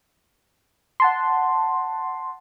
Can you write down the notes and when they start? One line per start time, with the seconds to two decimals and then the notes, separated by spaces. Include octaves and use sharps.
1.00 F#5 A5 C6